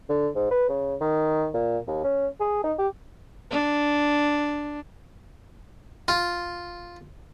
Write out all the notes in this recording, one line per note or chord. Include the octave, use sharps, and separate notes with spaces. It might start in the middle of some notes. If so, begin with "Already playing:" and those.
D3
G#2
B4
C#3
D#3
A#2
D#2
C#4
G#4
D#4
G4
D4
F4